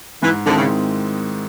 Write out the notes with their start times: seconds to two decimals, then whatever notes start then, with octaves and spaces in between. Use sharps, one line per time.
0.22 G#2 E3
0.46 D3 D#3 G#3 C4 E4
0.57 C#3